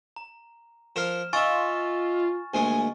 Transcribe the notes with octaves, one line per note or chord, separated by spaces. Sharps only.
A#5
F3 A#4 F5 F6 E7
D#4 F4 E5 G#5 C#6 A6
D2 A#2 G#3 G#5